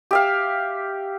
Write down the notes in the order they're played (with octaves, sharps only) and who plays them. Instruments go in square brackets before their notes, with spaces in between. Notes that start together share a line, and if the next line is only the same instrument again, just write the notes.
[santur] G4 E5 F5